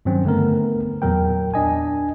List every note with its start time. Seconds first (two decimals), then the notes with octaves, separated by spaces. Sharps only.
0.05 G2 D#3 F#3 C4 C#4
0.25 D3 A3 B3 A#4
1.02 E2 A#2 F#3 A#4 G5
1.54 D4 D#5 G#5